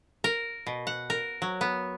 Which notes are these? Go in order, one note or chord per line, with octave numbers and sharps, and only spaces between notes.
A#4
B2
F#5
A#4
F#3
B3